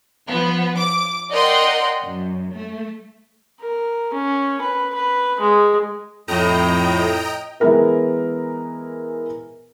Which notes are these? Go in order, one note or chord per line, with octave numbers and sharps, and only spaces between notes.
F3 B3
D6
A#4 D5 D#5 F#5 G5 C6
F#2
A3
A#4
C#4
B4
B4
G#3
F2 A2 D#5 G5 A#5
E3 G#3 B3 E4 A#4 B4